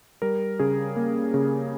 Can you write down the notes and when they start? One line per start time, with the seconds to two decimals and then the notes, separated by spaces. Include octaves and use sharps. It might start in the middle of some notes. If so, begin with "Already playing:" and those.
0.22 G3 A#4
0.59 C#3 G#4
0.96 A#3
1.34 C#3